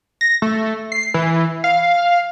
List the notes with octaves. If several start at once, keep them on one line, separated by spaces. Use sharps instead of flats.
A#6
A3
C7
E3
F5